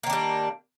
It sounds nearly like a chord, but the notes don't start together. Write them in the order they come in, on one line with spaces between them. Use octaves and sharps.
A#3 D#3 D4 G3